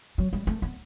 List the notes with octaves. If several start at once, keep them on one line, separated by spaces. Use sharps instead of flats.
F#3
G3
A3
B3